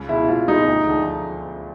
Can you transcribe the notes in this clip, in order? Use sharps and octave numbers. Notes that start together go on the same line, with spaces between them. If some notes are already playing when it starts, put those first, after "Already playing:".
Already playing: C#2
B2 G#3 E4
C#2 F4
B2 G#3 D#4
D2
D3 F3 G#3